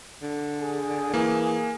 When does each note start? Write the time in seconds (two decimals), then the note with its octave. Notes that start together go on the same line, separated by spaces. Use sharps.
0.22 D3
0.62 G#4
1.14 E3 A#3